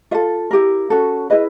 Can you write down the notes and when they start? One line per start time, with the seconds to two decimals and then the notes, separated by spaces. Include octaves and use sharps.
0.11 F4 E5
0.14 A4
0.51 E4 G4 A#4
0.90 C#4 F#4 A4
1.30 E4 G#4 B4 D#5